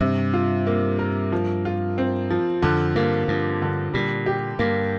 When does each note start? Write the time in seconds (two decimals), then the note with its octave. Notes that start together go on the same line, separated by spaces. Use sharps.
0.01 G2 C3
0.34 F4
0.67 A#3
0.99 A#4
1.32 F3
1.65 F4
1.98 C4
2.30 F3
2.62 F2 D3
2.95 G2 A#3
3.28 G2 F3
3.62 D3
3.94 A#2 G3
4.26 G4
4.59 G2 A#3